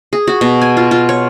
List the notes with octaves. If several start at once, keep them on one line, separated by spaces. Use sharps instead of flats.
G#4
F#4
B2
G#5
F4
F4
C#5